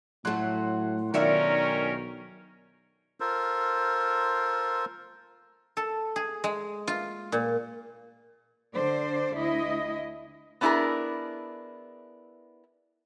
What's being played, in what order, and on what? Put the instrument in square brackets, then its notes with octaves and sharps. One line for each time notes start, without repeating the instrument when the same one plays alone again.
[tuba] A2 [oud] F#3 A3 [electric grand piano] F#5 C6 F#6
[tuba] B1 [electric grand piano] D#3 C#7 [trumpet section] C#4 A#4 [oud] D4 F4 E5
[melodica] F4 A4 A#4 C5
[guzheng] A4
G#4
G#3
F4
A#2
[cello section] D3 C5 D5
D2 E4 D#5
[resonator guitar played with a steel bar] B3 D4 E4 G4 G#4 A#4